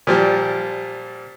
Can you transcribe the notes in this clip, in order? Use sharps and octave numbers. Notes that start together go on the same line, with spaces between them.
A#2 F3 G3